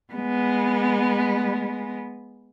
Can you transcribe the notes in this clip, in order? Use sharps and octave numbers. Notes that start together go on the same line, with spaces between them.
G#3 B3